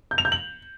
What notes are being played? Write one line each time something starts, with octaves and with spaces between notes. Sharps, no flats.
G6
F7
G6
F#7